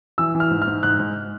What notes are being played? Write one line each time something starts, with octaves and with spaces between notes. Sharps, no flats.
E3 E6
E3
F6
G#2
F6
G#2
G#2 F#6
G#2